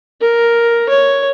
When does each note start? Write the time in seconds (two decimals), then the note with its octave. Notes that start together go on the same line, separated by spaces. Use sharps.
0.21 A#4
0.89 C#5